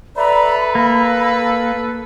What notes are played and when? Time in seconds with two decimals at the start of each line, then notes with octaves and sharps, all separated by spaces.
0.16 A4 B4 D5 E5 A#5 B5
0.75 A#3 E6